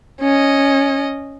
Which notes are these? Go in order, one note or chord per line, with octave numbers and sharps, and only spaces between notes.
C#4 D#5